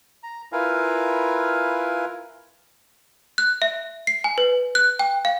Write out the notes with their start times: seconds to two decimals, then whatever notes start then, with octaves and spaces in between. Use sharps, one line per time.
0.23 A#5
0.52 E4 F4 A#4 B4 F5 G#5
3.38 F#6
3.62 E5
4.07 C7
4.24 G#5
4.38 B4
4.75 F#6
4.99 G5
5.25 F5